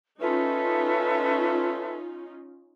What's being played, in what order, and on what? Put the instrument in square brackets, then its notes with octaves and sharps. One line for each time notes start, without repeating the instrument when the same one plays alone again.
[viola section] C#4 D#4 F4 [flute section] A4 B4 E5